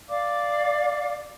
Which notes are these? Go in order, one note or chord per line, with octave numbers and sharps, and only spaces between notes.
D5 F5 D6